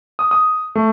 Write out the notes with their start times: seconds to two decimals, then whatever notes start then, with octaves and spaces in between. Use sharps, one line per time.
0.19 D#6
0.31 D#6
0.75 A3